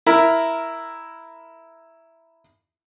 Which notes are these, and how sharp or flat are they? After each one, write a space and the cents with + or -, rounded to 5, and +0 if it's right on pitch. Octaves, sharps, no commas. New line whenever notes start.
E4 +0 A#4 +0